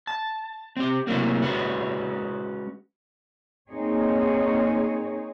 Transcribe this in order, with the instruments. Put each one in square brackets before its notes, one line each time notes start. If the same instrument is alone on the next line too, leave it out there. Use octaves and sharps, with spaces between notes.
[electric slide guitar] A5
C4 G4
C3 E3 F#3 A3 A#3 C4
G#3 C#4 F#4 B4
[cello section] A#3 C4 D#4 G#4 C#5